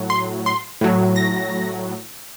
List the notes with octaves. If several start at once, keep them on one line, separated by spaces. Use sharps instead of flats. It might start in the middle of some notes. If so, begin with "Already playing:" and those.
Already playing: A2 F#3
C6
C6
A2 F#3
A#6